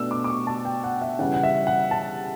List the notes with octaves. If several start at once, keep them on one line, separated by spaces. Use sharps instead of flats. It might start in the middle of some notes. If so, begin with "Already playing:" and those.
Already playing: B2 A3 D4 E6
D6
D6
C#6
A5
G5
F#5
E5
C#3 E3 G3 C#4 F#5
F#5
E5
F#5
A5